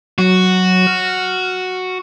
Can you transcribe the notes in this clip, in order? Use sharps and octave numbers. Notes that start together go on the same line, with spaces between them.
F#3 F#4
F6